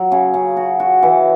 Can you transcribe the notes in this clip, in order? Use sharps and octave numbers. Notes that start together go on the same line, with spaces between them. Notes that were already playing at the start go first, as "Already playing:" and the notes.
Already playing: F#3
C#3
C#3
F#4
F#4
E3